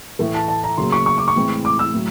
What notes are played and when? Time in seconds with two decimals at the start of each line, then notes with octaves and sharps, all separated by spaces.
0.19 A2 E3 A3
0.34 A5
0.48 A5
0.64 A#5
0.77 C#3 F#3 A#3 C6
0.92 C#6
1.06 C#6
1.18 D6
1.28 C#6
1.36 A2 E3 G#3 C4 E4
1.65 D6
1.79 E6
1.94 A2 F#3